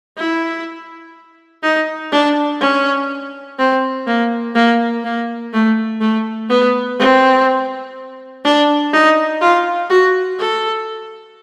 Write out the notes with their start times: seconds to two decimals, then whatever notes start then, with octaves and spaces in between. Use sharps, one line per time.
0.17 E4
1.63 D#4
2.12 D4
2.61 C#4
3.59 C4
4.07 A#3
4.55 A#3
5.04 A#3
5.53 A3
6.01 A3
6.49 B3
6.99 C4
8.45 D4
8.93 D#4
9.41 F4
9.90 F#4
10.39 A4